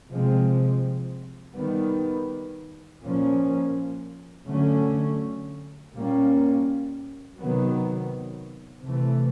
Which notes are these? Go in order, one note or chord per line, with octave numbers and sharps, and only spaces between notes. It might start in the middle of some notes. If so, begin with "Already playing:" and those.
C3 F3 G#3 C4
D#3 G3 B3
A#2 F3 A#3 C#4
D3 F#3 A3 C#4
A#2 G3 A#3 C#4
C3 D#3 F#3 B3
C3 E3 A3